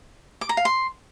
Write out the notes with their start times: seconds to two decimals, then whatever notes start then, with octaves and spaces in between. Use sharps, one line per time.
0.41 D6
0.49 A#5
0.57 F5
0.65 C6